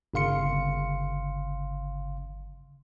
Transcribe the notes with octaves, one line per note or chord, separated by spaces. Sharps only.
G1 C#3 F5 C6 C#7